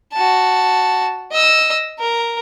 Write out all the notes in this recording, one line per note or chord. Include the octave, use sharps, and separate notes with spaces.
F#4 A5
D#5 E6
A#4